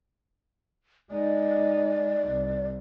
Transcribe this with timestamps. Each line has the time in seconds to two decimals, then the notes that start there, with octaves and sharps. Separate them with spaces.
1.11 G#3 D#4 D5
2.29 C2